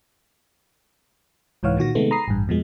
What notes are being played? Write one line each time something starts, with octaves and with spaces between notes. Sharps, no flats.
C2 G#2 E3 C#5 F5 F#5
A#2 D#3 F#4 A#6
C3 D#3 G#3 A3 B3
A#5 B5 D#6 C7
A1 G2
F2 B2 F3 G#3